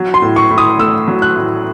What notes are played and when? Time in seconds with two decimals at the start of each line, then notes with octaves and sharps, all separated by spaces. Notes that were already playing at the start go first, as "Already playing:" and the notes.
Already playing: F#3
0.14 C6
0.22 A2
0.36 C#6
0.51 A2
0.58 D#6
0.79 A3 E6
1.08 F#3
1.22 F#6
1.36 A2